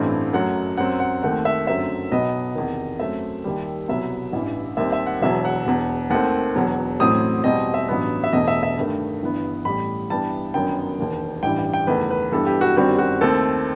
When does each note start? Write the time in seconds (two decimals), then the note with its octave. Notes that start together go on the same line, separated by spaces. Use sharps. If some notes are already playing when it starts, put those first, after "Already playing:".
Already playing: A1 G2 E3 A3 C4
0.33 F#2 F#3 A3 F#5
0.78 F#2 F#3 C4 F#5
1.00 F#5
1.23 D#2 D#3 A3 C4 F#5
1.45 E5
1.67 G1 F#2 F#3 A3 C4 E5
2.12 B1 B2 F#3 B3 D#5
2.55 E2 C3 D#3
2.99 F#2 F#3 A3 C4 E5
3.44 D#2 D#3 G3
3.88 C2 B2 F#3 B3 E5
4.33 A1 G2 E3
4.77 D#2 D#3 G3 C4 E5
4.92 E5
5.07 F#5
5.22 E1 E2 B2 F#3 E5
5.45 F#5
5.66 E1 E2 B2
6.10 D#2 D#3 A3 C4 F#5
6.56 E1 E2 B2 F#3
7.00 A1 A2 F#3 C4 D#6
7.44 E2 B2 G3 C4 D#5
7.74 E5
7.89 A1 G2 F#3 B3
8.24 E5
8.33 E1 E2 B2 A3 D#5
8.48 E5
8.63 E5
8.78 G2 D#3 A3
9.22 G1 G2 E3 B3
9.65 A1 A2 G3 B5
10.10 G2 E3 G3 B3 A5
10.54 G1 F#2 D#3 F#3 B3 G5
10.98 E1 D#2 D#3
11.43 A1 G2 E3 G3 G5
11.59 G5
11.73 G5
11.87 F#1 E2 D#3 A3 B4
12.10 B4
12.32 G2 E3 G3 B3 A4
12.47 G4
12.61 F#4
12.77 G1 F#2 D#3 G3 C4 F#4
12.99 F#4
13.21 D#2 D#3 A3 C4 A4